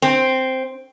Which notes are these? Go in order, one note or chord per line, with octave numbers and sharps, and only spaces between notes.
C4